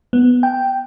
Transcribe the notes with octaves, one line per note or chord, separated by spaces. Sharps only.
B3
G5